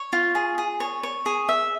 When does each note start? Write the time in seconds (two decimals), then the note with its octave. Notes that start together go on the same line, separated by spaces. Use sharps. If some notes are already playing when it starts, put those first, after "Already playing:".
Already playing: C#5
0.13 F4
0.35 G#4
0.58 G#4
0.80 C#5
1.03 C#5
1.26 G#4
1.49 E5